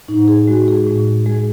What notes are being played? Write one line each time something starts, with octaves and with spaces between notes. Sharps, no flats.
A2 D#4
G#4
G#3 F#4
G#4
A2
G#3 G#4